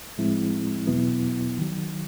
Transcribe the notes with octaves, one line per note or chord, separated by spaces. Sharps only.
A2 F3 G#3 C4 E4
E2 B2 F#3 B3 E4
D#3 F#3